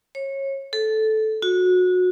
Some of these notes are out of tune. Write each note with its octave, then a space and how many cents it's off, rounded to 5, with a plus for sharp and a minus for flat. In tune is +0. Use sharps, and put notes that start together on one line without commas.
C#5 -25
A4 -10
F#4 -25